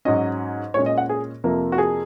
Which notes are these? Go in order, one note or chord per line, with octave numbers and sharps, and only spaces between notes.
G#2 F#3 C#4 D#5
A#2 G#3 C#4 C#5
D#5
F#5
G#4
F2 C3 F3 A#3
F#4
G#4